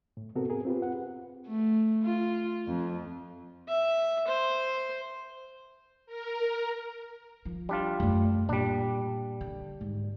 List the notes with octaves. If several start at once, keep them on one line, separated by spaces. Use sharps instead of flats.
A2
C3 B3 C4 F#4 A4 A#4
G#4 A#4
C4 F4 G4 B4
F#5
A3
F4
F2
E5
C5
A#4
F3
G3 D4 F4
F#2 A3
A#2 G3 D4
D3
G#2